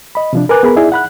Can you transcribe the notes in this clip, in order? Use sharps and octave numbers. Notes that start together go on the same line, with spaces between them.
D#5 B5
C3 F3 D4
A#4 B4 G#5 D6 F#6
B3 G#4 A#4 B5
D#4 E4 G#4 D5 E5
F#5 B5 F#6